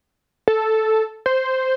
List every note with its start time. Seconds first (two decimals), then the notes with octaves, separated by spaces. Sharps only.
0.48 A4
1.26 C5